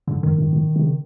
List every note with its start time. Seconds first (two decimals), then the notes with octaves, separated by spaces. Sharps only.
0.07 G2 D3
0.23 F#2 D#3
0.38 G2
0.53 G#2
0.76 C3
0.84 C#3